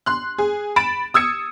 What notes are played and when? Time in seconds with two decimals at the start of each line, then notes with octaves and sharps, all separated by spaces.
0.06 C6 F#6
0.38 G#4
0.76 B5 A6 D7 E7
1.14 D#6 E6 G#6 C#7